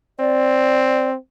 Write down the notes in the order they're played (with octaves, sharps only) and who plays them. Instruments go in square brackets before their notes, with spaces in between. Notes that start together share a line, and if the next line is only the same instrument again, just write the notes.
[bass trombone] C4 [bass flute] D5